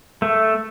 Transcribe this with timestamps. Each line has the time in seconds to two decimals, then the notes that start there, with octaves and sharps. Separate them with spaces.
0.22 A3